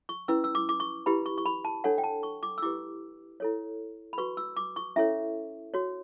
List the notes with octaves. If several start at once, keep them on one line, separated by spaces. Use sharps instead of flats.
C#6
C#4 E4 B4 E6
E6
D6
D6
C#6
E4 G4 B4 B5
C#6
C#6
B5
A5
D4 A4 C#5 F#5
G5
A5
C#6
D6
E6
E4 G4 B4 D6
E4 A4 C#5
B5
F#4 B4 C#6
E6
D6
C#6
C#4 E4 A4 C#5 E5
F#4 C#5